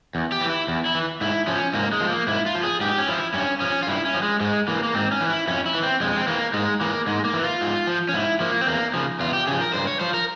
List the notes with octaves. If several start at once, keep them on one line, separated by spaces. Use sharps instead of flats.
E2
G4
E3
E4
E2
E4
E3
G#2 E4
F3 C#4
G#2 A#3
G#3
F3
A#3
G#2 E4
F4
F3
G#4
G#2 G4
C#4
F3 E4
G2 C#4
F3 C#4
F4
G2 E4
C#4
F3
G#3
G#2 G#3
E3 A#3
A#3
G#2 C4
C#4
E3
E4
F2 C#4
E4
E3
C4
F2 G#3
C4
E3 A#3
G#2 G#3
E3 A#3
G#2 G#3
A#3
E3
F4
G#2
F3
C#4
G#2 E4
F3 A#3
C4
E2 A#3
C#3 F3
E2 F4
G4
C#3 F3 G#4
A#4
G2 C5
C#5
F3 C5
A#4